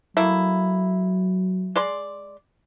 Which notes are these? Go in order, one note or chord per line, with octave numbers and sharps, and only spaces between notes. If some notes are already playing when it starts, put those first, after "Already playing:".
F#3 A3 A#3 E4
G#3 D5 C6